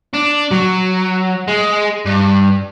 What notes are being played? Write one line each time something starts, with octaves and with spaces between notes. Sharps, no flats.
D4
F#3
G#3
G2